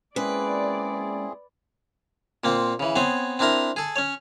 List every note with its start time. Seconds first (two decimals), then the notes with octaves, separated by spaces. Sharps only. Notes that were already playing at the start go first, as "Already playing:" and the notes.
0.16 G#3 A#3 C4 C#4 E4 G#4 B4 D5
2.44 A#2 A#3 C4
2.80 C#3 E3
2.96 B3 C4 G#4 C#5
3.39 C4 D4 E4 A#4 A#5
3.76 G#4 A4
3.96 C#4 C#5